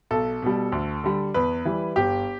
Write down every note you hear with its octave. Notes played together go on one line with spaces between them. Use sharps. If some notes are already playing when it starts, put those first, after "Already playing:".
B1 A4
B2 G3
D2
D3 G3
E2 B4
E3 G3
G1 G4